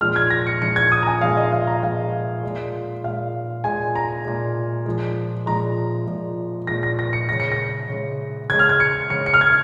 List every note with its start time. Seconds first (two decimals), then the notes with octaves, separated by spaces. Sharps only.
0.01 A#2 F3 G#3 F6
0.16 G#6
0.30 A#6
0.47 C#7
0.61 A#2 F3 G#3 C#7
0.76 G#6
0.92 D#6
1.03 A#5
1.07 G#5
1.21 A#2 F3 G#3 F5
1.37 D#5
1.52 F5
1.67 A#5
1.83 A#2 F3 G#3 F5
2.43 A#2 G#3
3.04 A#2 G#3 F5
3.64 A#2 G#3 G#5
3.95 A#5
4.25 A#2 G#3
4.86 A#2 F3 G#3
5.46 A#2 F3 G#3 A#5
6.07 A#2 F3 G#3
6.67 A#2 F3 G#3 A#6
6.83 A#6
6.99 A#6
7.13 C#7
7.29 C#3 G#3 A#6
7.40 C#7
7.52 A#6
7.89 C#3 G#3
8.50 C#3 G#3 G#6
8.59 F6
8.69 G#6
8.80 C#7
9.10 C#3 G#3 C#7
9.26 C#7
9.34 F6
9.41 G#6